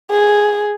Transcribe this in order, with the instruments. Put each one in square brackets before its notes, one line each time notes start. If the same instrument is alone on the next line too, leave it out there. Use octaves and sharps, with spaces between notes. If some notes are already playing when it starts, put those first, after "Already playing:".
[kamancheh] G#4